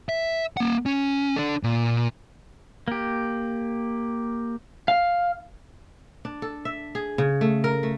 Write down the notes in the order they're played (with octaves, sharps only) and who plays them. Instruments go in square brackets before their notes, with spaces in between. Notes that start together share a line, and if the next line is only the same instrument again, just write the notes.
[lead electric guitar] E5
A#3 F#5
C#4
D4 A4
A#2
[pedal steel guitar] A#3 G4
[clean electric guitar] F5
[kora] D4
A4
E5
G#4
C#3
A3
A#4
A3